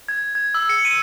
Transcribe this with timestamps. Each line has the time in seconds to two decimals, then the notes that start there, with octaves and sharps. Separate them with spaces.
0.08 G#6
0.35 G#6
0.54 E6
0.69 C#7
0.85 D#7